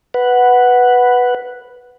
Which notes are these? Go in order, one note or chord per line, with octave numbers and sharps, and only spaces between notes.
B4 F#5